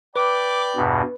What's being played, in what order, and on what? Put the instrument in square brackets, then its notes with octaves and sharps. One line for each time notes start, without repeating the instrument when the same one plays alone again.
[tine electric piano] B4 [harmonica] D5 G5 B5 [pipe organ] D6
[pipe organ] E2 G2 B2